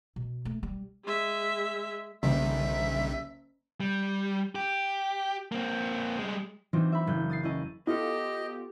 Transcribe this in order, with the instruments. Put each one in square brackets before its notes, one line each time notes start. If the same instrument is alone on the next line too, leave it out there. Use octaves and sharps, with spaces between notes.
[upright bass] B2
A3
G3
[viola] G#3 E5
[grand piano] F#1 [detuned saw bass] B1 [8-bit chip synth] D3 D#3 G3 [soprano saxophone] E5
[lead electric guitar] G3
G4
A#3 C4
G3 G#3
[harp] E3 F#3 C4 D4 D#4 F4
E5 B5
F#1 F#6 G6
D#6 A6 C7
C#4 E4 D#5 A5
[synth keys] B3 F4 A4 [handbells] E4 [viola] G4 [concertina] D#5